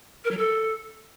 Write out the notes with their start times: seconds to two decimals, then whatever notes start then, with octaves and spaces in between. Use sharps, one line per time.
0.24 A#4
0.31 F#3
0.37 A4